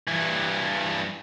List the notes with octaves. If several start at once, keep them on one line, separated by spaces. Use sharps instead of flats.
G2 E3